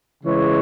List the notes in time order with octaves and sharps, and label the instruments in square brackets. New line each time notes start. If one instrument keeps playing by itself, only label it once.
[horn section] C#3 E3 G#3 C#5